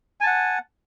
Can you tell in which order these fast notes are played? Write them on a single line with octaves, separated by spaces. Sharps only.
G#5 A5 F#5